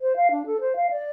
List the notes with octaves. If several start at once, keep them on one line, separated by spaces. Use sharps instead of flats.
C5
F5
D4
A4
C5
F5
D5